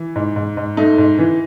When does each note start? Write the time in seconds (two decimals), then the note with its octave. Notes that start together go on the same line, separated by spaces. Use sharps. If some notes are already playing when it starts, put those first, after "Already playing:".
Already playing: E3
0.16 G#2
0.36 G#2
0.57 G#2
0.77 A3 D#4
0.98 G#2
1.19 E3